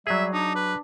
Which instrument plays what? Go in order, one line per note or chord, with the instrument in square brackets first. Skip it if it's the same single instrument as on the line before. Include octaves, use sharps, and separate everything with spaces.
[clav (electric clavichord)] F#3 G#4 [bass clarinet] G3 [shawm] E5
[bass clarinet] D4 [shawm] D#4
[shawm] B4